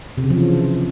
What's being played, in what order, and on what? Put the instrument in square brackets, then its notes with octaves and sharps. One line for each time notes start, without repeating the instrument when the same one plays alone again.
[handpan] C3
C#3
F3
E3